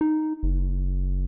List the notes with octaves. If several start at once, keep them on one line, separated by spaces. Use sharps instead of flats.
D#4
F#1